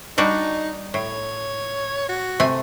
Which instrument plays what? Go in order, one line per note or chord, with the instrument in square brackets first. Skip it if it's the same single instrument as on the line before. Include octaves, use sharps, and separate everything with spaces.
[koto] G3 D4 F#4 [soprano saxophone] D#4
[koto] A2 [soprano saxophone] C#5
[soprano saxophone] F#4
[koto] C3 A3 G#5